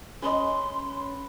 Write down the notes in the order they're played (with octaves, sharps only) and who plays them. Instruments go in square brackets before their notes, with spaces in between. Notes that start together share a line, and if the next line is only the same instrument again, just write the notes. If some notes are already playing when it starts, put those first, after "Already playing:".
[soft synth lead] C#4 [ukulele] G#4 D#5 [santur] B4 [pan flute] C6